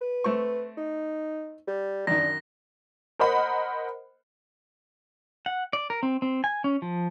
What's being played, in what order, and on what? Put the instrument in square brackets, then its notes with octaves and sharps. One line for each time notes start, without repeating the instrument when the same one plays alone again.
[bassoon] B4
[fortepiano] A3 C4 C#6
[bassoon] D#4
G3
[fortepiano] F#2 D#3 [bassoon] D4 [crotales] A#6
[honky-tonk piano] A#4 C5 D#5 F#5 B5
[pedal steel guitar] F#5
D5
A#4
C4
C4
G#5
C#4
F3